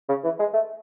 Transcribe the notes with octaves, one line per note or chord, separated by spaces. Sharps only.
C#3
E3
G#3
A3